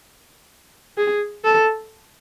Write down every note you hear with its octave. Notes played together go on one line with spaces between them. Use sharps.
G#4
A4